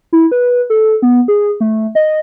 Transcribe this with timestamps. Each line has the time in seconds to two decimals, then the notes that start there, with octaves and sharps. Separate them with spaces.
0.13 E4
0.32 B4
0.70 A4
1.02 B3
1.28 G#4
1.60 A3
1.95 D#5